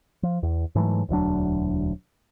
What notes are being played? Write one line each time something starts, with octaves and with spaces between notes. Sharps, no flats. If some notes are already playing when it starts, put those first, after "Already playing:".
F3
E2
G#2 E3 F#3 A3
E1 D2 F#3 D4